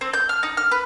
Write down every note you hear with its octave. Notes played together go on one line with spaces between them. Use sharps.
C4
G6
F6
D#4
F6
B4